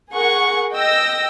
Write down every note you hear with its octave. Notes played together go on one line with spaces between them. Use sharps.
G#4 A#4 F#5 C#6
D#5 G5 E6 A#6